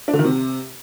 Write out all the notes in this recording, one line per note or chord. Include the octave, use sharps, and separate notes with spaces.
D4
D3
D#3
C3